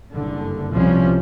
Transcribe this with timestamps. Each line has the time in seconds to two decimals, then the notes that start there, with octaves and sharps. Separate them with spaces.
0.13 F#1 G2 D3
0.70 C2 B2 F3 G3 C#4